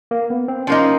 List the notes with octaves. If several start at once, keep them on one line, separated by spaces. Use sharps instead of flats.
A#3
B3
C4
F3 A#3 C#4 D#4